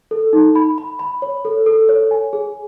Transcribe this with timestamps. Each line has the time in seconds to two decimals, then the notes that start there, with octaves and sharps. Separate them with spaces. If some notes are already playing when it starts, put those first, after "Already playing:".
0.11 A4
0.33 D#4
0.55 B5
0.78 B5
0.99 B5
1.22 C#5
1.45 A4
1.66 A4
1.89 C#5
2.11 G#5
2.33 G#4